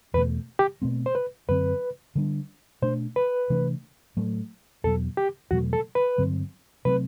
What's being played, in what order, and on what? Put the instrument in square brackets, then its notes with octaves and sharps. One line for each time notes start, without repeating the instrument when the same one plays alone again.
[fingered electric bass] E2 [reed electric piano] B4
[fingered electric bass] B2 A3
[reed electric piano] G4
[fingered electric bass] B2 A3 C4
[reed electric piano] C5
B4
[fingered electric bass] F#2 D3 F#3 C4 [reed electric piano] B4
[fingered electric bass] D3 G3 D4
[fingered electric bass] B2 A3 D4 [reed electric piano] C5
[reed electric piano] B4
[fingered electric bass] C3 E3 A3 D4
A2 F#3 A3
[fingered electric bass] E2 B2 F#3 [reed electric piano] A4
[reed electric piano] G4
[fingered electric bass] E2 B2 F#3 A3 [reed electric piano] F#4
[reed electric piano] A4
B4
[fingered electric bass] G2 D3 F#3 C4
[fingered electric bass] C3 F#3 A3 C4 [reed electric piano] B4